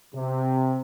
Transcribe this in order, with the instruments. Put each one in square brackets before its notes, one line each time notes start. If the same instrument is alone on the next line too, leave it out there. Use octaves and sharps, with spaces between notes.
[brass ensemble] C3